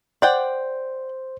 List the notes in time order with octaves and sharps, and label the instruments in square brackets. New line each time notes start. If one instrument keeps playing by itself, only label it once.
[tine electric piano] C5 [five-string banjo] D5 F#5 G5